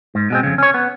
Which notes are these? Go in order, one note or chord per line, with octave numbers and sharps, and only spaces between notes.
G#2
B2 G#3 C4
F2 C#3
C#4 C#5
B3